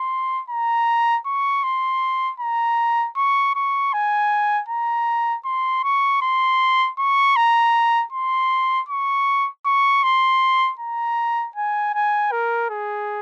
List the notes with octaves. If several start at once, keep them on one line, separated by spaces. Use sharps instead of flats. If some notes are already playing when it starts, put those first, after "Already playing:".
Already playing: C6
A#5
C#6
C6
A#5
C#6
C#6
G#5
A#5
C6
C#6
C6
C#6
A#5
C6
C#6
C#6
C6
A#5
G#5
G#5
A#4
G#4